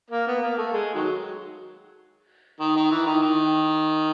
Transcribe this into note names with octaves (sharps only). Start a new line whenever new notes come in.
A#3
B3
A#3
A3
G#3
D#3 F#3
D#3
D#3
E3
D#3
D#3